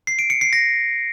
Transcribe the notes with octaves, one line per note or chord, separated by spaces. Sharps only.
C7
D7
C#7
C7
A#6